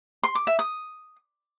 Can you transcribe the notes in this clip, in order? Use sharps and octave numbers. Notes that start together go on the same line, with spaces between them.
C6
D6
E5
D#6